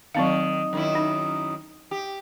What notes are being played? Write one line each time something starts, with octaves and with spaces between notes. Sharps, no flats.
D#3 F#3 C4 F5
F#2 D#3 E4
D#4
G4